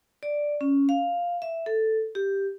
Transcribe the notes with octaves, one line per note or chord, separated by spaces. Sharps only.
D5
C#4
F5
E5
A4
G4